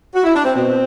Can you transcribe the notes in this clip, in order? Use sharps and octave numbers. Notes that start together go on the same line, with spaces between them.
F#4
E4
D4
C4
B2 C4